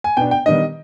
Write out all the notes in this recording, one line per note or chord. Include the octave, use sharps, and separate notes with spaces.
G#5
B2 B3 D4 G5
G5
D#3 G3 B3 D4 D#5